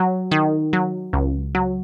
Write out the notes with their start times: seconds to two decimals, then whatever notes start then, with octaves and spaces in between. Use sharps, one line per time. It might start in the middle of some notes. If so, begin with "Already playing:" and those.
Already playing: F#3
0.31 D#3
0.73 F#3
1.13 C#2
1.55 F#3